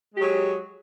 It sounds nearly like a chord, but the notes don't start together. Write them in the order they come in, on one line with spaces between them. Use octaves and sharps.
G#3 G4 G#4 F#3